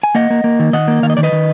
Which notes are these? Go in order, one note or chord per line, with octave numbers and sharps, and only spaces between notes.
G#5
A#3 D#5 F#5
A#3
A#3
D#3
D#3 D#5 F#5
A#3
D#3 F5
D#5
D#3 D5
B4 D#5
D#3